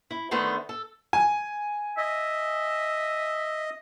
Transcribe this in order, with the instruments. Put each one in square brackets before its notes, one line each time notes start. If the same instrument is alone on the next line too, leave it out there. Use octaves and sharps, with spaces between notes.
[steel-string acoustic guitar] E4
D3 D#3 A3 B3 C5
A4
[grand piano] G#5
[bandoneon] D#5 [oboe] E5